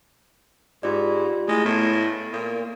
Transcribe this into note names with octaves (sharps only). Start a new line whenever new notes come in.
G#2 F4 G4 D5
G#3 A3 E4
A2 B3
A#2